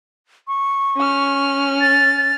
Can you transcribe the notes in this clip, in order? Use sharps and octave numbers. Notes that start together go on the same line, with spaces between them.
C#6
C#4 F6
A6